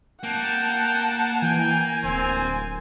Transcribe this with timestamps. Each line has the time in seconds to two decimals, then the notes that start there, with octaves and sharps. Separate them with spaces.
0.23 A#3 F#5 G5 A5
1.42 E3 G5 G#5
2.04 D1 C4